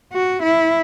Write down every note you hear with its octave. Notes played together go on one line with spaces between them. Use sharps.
F#4
E4